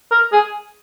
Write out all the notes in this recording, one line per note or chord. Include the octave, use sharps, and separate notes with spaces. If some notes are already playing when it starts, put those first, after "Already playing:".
A#4
G#4